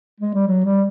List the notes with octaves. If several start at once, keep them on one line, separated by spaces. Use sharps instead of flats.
G#3
G3
F#3
G3